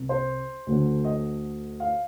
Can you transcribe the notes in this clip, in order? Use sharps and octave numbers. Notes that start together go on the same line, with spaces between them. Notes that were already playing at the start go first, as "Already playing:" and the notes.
Already playing: C2 C3
C5
D2 D3
D#5
F5